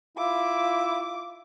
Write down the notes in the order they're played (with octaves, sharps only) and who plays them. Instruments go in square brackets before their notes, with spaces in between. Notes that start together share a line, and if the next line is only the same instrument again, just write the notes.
[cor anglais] E4 [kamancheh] F4 D6